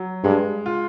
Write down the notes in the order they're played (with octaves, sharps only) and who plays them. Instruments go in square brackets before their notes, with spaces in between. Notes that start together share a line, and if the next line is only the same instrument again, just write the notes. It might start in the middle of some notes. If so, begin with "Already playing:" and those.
Already playing: [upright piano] F#3
[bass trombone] G2 [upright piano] G#3
[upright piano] F4